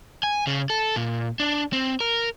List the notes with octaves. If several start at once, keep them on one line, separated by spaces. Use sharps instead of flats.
G#5
C#3
A4
A#2
D4
C4
A#4